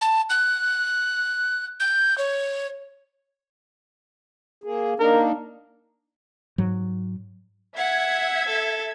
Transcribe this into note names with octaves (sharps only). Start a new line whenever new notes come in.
A5
F#6
G6
C#5
A#3 G#4
A#3 D4 D#4 A#4
G#2 F#3
E5 F#5 G#6
A4